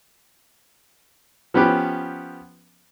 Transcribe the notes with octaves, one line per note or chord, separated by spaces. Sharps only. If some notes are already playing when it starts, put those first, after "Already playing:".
F3 B3 C#4 G4 B4